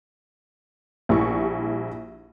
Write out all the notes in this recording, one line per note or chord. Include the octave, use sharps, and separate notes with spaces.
A#1 G3 E4 C#6